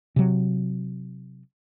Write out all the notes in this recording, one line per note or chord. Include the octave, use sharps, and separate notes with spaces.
C3 F#3